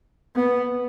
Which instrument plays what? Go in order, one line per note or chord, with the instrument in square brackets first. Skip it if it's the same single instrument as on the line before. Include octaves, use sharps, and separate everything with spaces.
[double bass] B3